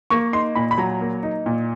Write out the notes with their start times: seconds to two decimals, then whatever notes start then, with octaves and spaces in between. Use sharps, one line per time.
0.10 A#3 C#6
0.33 D#4 C6
0.55 A#2 B5
0.71 B5
0.78 F#3 A#5
1.01 A#3
1.23 D#4
1.46 A#2